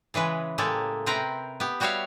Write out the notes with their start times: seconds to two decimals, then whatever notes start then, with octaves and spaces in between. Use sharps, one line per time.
0.14 C#3 E3 G#3 B4
0.58 A2 G#3 A#3 G4 A4
1.06 C3 C4 A#4 B4 A#5
1.60 B3 G4
1.80 G3 F#4 G4 C#5 E5 F5